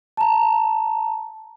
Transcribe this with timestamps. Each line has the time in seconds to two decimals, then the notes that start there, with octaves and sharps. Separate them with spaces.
0.17 A5 A#5